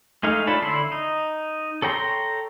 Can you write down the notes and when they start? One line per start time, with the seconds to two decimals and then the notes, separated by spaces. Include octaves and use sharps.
0.23 G#3 A3 D#4 F5
0.47 D4 F4 C#5 A5 B5
0.62 D3 E4 C6
0.92 D#4
1.82 A4 C#5 G5 A#5 C6